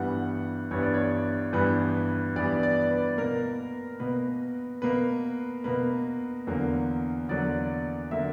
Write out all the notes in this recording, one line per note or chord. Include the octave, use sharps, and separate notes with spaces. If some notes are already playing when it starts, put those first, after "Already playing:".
Already playing: G2 E3 G3 B3 F#5
G2 E3 G3 B3 C#5
D5
C#5
G2 E3 G3 B3 B4
G2 E3 G3 B3 D5
D5
B4
B2 A#3 A#4
B2 A#3 B4
B2 A#3 B4
B2 A#3 B4
E2 D3 F#3 A#3
E2 D3 F#3 A#3 D5
D3 F#3 A#3 E5